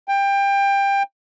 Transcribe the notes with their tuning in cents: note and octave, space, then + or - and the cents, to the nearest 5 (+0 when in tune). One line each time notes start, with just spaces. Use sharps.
G5 +20